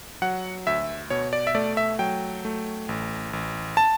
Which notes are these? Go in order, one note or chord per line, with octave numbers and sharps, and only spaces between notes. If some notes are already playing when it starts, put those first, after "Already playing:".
F#3 F#5
D2 E5
B2 C#5
D5
E5
A3 D5
E5
F#3 G5
A3
A1
A1
A5